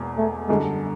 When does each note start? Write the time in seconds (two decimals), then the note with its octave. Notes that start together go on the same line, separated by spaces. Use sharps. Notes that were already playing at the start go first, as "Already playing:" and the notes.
Already playing: E1 E2 B2 A#3
0.17 A3
0.48 F#2 D3 G3 G#3